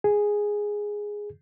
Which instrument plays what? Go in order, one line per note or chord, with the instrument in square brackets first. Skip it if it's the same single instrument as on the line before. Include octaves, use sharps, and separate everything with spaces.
[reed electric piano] G#4